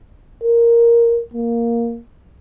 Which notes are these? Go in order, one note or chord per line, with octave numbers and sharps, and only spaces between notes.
A#4
A#3